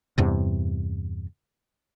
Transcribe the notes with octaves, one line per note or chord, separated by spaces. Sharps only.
E2 G2 C3